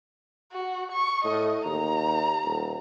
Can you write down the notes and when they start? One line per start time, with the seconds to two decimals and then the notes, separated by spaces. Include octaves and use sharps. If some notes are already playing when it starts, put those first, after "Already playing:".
0.52 F#4
0.92 C#6
1.24 A2 D#5
1.65 D#2 A#5
2.45 D#1